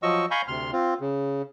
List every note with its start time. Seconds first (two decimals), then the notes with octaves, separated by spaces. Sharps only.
0.03 F3 F#3 D#5 C#6 E6
0.31 F5 G#5 A#5 B5 C#6 G6
0.48 D2 C3 C6 F6
0.73 C4 F4
1.00 C#3